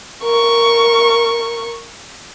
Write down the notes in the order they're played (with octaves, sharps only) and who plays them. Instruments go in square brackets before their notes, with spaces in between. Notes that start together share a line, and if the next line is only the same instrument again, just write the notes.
[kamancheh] A#4 C#6